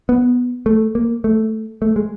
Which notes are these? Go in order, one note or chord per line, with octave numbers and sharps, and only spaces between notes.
B3
A3
A#3
A3
A3
G#3